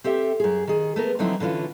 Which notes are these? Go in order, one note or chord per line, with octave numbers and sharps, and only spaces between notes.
C4 G4 A4 E5
F#2 G#4
D#3 G#4
A3 B3 A#4
D3 F3 F#3 C4 D#4 E4
D3 E3 C#4 F4